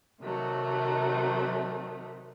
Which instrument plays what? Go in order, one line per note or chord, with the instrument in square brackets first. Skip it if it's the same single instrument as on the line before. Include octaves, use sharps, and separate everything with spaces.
[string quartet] C3 D#3 F#3 A3